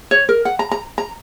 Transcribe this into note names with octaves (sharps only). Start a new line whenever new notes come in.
C#5
A#4
F#5
A#5
A#5
A#5